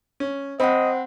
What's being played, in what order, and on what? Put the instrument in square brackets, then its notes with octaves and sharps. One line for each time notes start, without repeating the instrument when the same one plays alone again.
[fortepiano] C#4
[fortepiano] C4 B5 [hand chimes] C5 F#5 [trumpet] D#5